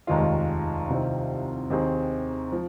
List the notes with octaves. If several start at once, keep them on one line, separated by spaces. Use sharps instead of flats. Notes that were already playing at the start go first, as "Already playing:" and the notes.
F1 D#2 D#3 G#3 F4
C2 C3 D#3 C4 F4
D#2 D#3 C4 G#4
F3